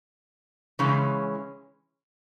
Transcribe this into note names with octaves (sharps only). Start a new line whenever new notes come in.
C#3 E3 G#3 C#4